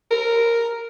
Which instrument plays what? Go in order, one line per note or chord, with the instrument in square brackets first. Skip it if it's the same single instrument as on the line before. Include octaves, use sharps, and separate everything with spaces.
[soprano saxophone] A#4